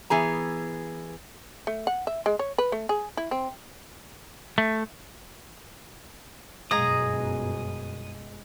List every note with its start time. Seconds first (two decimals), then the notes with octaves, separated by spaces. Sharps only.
0.10 E3 B3 G#4 A#5
1.67 A3
1.87 F#5
2.07 E5
2.26 G#3
2.39 C#5
2.58 B4
2.72 A3
2.89 G#4
3.17 E4
3.31 C4
4.58 A3
6.71 G1 F#2 B2 G#3 G#4 A#5 D#6